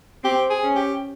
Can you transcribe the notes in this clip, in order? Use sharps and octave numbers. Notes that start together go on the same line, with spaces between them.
C4 G4
G#4
C#4
G4